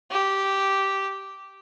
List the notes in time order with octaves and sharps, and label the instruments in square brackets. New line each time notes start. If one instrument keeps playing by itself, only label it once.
[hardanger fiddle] G4